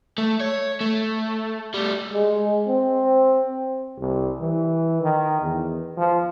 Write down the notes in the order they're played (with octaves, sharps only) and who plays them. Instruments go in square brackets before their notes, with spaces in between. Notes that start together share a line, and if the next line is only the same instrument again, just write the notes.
[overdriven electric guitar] A3
C#5
A3
G3 A3
[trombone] G#3
C4
[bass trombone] C2
E3
D#3
E2
F3